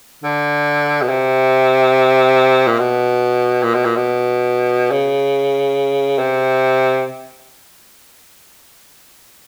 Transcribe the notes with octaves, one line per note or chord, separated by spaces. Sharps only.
D3
B2
C3
A#2
B2
A#2
B2
A#2
B2
C#3
C3